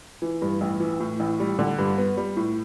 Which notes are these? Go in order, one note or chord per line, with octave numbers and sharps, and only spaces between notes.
E3
G2
A1
E3
A2
A1
G3
D3
G2
B3
G3
A2